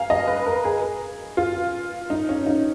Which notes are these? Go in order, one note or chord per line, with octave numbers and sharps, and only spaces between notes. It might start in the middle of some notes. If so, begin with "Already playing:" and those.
Already playing: F5 G#5 A#5
D#5
B4
A#4
G#4
F4
D#4
C#4
D#4